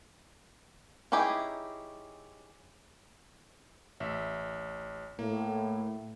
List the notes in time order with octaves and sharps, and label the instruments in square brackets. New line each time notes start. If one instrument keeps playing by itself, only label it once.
[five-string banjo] C#4 D#4 E4 G4 G#4
[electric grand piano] A1 E5
[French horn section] A2 [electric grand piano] A#3